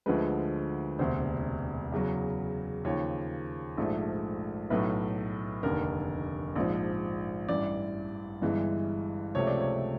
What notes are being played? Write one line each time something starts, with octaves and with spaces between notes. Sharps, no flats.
D2 D3 F3 G#3 B4
E1 D2 C3 C5
E2 C#3 F#3
D#2 C#3 F3 C#5
A#1 G#2 F3 A3
B1 A2 F#3 A3 B4
F1 D#2 D3 A#4
A#1 G#2 F3
A1 G2 E3 D5
G1 G2 E3 G#3
C#2 C3 F3 A3 C#5
D5
C#5